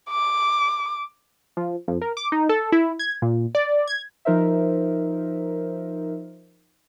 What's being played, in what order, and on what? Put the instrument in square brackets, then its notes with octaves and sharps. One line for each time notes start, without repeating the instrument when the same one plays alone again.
[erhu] D6
[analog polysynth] F3
F2
A#4
D6
D#4
A4
E4
G#6
A#2
D5
G#6
[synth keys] F3 D#4 A#4 C5 E5